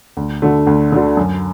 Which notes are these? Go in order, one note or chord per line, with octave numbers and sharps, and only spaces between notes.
D2
D3 A3 D4 F#4
D2
D3 A3 D4 F#4
F#2